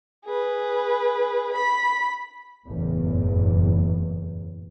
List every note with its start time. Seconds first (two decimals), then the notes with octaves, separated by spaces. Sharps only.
0.25 G#4 B4
1.54 B5 B6
2.67 F#1 E2 A2